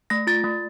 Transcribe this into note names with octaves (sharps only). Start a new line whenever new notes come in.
A3 A#6
F4 A6
A3